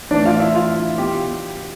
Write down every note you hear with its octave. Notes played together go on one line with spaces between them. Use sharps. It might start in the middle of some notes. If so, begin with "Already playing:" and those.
A2 E3 D4 D5
F4 F5
E4 E5
F4 F5
B2 G4 G5